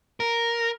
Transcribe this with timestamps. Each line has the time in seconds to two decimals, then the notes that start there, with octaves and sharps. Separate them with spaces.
0.20 A#4